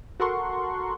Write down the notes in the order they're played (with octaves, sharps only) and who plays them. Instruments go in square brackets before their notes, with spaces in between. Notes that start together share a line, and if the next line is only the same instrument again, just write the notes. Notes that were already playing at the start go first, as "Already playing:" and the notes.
[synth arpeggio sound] F#4 A4 A#4 F#5 C6 C#6